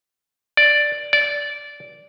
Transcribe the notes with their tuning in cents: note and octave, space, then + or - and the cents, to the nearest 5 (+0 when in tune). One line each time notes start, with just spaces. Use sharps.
D5 +0
D5 -15